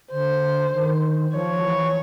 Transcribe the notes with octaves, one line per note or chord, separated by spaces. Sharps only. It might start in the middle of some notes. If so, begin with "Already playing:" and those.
D3 C5
D#3
F3 C#5
E3